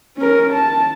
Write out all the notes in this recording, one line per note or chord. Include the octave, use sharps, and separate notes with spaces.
C#4 A#4
A5